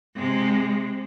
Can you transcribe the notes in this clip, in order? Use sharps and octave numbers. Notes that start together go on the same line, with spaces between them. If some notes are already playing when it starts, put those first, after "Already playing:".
C3 G#3